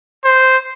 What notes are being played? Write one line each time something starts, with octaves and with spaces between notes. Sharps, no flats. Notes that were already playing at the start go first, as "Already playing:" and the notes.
C5